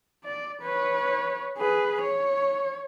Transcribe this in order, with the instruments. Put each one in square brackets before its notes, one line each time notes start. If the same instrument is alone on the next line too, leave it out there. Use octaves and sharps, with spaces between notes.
[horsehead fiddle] D5
B4 C#5
G#4 B4
C#5